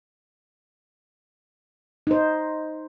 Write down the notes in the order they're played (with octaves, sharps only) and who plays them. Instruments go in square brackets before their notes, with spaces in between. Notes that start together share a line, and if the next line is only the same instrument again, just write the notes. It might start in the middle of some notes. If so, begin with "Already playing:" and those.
[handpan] D#4 C5